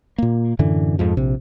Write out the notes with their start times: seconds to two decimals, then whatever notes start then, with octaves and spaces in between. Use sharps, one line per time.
0.18 A#2 A#3
0.59 F#2 A2 D3 E3
0.99 F2 G#2 F3
1.17 A#1 C3